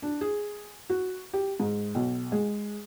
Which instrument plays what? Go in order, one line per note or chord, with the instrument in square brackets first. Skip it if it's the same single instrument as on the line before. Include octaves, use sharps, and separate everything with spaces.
[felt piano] D4
G#4
F#4
G4
G#2
B1
G#3